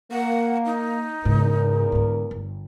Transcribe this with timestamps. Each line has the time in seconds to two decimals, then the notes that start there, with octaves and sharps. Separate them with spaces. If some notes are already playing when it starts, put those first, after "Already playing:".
0.11 A#3 F#5
0.66 D#4
1.25 E2 G#2 C#3 A#4
1.92 G#2 D3
2.31 G1